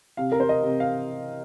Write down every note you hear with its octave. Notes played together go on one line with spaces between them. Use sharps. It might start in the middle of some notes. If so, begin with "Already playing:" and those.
C3 F5
A#4
C5
D#5
C3
F5